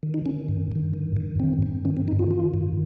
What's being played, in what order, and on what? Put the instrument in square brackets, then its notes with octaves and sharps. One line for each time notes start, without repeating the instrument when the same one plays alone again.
[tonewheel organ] D#3
D#4
D#3 C#4
G2
G2
D#3
G2
G2 C4
G2
D#3 C#4
C4
D#3 D#4
F4
D#3 F4
G2